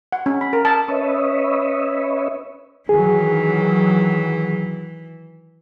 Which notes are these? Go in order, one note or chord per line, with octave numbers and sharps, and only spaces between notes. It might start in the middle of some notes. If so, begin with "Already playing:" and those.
F#5
C#4
B5
A#4
A5
C#4 B4 C#5 D#5 E5
D#3 E3 F#3 G#4